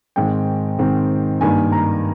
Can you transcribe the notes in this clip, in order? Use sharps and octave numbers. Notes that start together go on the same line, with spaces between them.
G#2 D#3 G#3 C4 G5
G#2 D#3 G#3 C4
G2 D#3 A#3 G#5
A#5